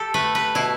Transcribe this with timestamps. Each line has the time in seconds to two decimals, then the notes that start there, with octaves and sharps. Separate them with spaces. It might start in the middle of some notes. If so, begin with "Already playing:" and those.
Already playing: G4 A4
0.14 A3 B4
0.35 B4
0.55 B2 E4